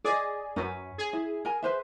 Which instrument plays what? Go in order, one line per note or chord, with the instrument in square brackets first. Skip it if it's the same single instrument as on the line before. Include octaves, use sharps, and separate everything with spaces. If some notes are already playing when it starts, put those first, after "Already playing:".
[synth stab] G#4 [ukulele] D5 D#5
[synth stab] F#2 [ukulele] C#4 B4
[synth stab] G#4
[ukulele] E4
A#4 G#5
B4 C5 E5